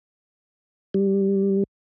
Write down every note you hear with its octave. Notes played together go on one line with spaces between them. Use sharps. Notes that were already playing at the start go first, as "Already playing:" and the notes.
G3